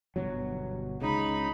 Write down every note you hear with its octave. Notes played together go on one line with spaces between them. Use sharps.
G1 B2 F#3
C#2 C#3 D#4 B5